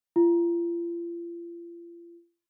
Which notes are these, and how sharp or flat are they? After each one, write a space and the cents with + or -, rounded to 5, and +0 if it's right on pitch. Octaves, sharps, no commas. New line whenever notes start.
F4 -40